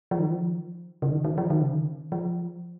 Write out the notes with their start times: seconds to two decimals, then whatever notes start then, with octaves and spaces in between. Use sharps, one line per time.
0.11 F3
0.19 D#3
0.28 F3
1.02 C#3
1.12 D#3
1.25 D#3
1.38 F3
1.50 D#3
1.62 C#3
1.73 D#3
2.12 F3